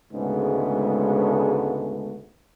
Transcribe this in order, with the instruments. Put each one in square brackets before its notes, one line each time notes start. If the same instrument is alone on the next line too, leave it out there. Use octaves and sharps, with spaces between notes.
[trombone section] D2 G#2 C#3 G#3 A3 B3